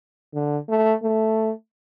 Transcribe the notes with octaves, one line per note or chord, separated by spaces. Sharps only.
D3
A3
A3